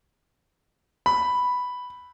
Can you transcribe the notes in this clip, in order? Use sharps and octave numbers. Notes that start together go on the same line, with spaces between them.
B5